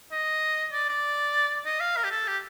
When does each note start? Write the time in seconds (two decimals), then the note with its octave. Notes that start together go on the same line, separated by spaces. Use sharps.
0.12 D#5
0.73 D5
0.89 D5
1.66 D#5
1.80 F5
1.97 A#4
2.04 G4
2.11 A4
2.28 G4